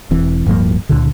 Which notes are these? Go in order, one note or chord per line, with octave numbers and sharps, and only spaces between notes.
E1 E3 C4
D1 G2 F3 A#3
C#2 A#2 D3